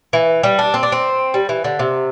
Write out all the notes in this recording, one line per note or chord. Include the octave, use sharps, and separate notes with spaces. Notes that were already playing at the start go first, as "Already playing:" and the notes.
E3
G3
D4
C4
D4
C4
G3
E3
D3
C3